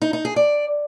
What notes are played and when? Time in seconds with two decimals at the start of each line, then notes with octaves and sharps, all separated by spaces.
0.02 D#4
0.13 D#4
0.25 G#4
0.36 D5